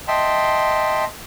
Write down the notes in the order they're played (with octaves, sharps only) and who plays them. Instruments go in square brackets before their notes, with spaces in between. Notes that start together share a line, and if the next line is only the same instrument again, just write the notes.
[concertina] D#5 E5 G5 A5 C6